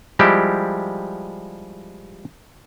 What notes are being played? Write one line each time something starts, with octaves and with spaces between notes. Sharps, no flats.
F3 G3 G#3 E4 G4